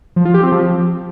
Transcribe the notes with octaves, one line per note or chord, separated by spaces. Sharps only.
F3
F4
G4
C4
F3